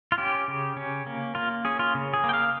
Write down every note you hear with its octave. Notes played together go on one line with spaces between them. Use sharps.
F4
C#4 G4
C#3
C#4
A#3
A#3 F4
C#4 G#4
F4
C#3
G#4
A#3
G5
F5